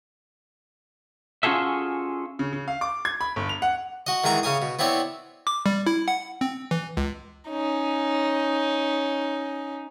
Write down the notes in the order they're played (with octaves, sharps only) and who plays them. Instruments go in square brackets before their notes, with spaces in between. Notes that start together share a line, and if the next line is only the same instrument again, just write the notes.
[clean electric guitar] C#4 F4 F#4 G#4 A4 E5
[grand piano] C#3
C#3
F5
D6
G#6
B5
G1
F7
F#5
[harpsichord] F#4 D#5
D#3 E3 G#3 F#4 A#5
C#3 C#4 G#5 D#6
B2
B3 C4 E4 C#5 D5
[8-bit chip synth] D6
G3
E4
F#5
C4
E3
C#2
[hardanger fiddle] C#4 D#4